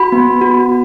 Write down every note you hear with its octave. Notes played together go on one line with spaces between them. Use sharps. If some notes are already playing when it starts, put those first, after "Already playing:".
Already playing: F#4 B5
B3
F#4